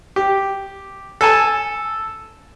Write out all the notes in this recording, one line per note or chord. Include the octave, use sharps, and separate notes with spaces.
G4
A4 G#5 A5